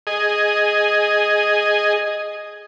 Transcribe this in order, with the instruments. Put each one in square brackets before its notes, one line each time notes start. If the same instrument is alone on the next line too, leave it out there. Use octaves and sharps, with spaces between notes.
[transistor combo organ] G#4 D#5